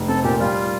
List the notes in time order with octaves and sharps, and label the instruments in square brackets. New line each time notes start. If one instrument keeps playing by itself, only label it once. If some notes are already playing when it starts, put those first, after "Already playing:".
Already playing: [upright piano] F1
[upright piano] C4 [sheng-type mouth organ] A4
[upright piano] A#2 [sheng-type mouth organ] G4
[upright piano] G3 [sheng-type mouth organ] F4